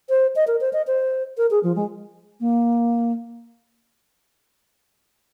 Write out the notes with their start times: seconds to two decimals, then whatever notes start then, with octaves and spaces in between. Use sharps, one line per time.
0.09 C5
0.36 D#5
0.47 A#4
0.61 C5
0.73 D#5
0.87 C5
1.38 A#4
1.51 G#4
1.63 F3
1.76 G#3
2.40 A#3